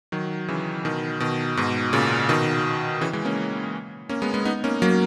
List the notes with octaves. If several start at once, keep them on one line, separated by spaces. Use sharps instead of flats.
D#3 F#3
C#3 E3
B2 D#3
B2 D#3
G#2 B2
A#2 C#3
B2 D#3
C#3 E3
E3 G#3
A#3 C#4
A#3 C#4
G#3 B3
G#3 B3
B3 D#4
A#3 C#4
F#3 A#3